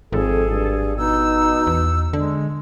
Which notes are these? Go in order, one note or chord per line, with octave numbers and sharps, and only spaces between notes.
G#1 F2 G#4 A4
G2
B2 D#4 E6
E2
D3 G#3